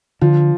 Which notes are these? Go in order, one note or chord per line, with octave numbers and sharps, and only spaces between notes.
D3 F3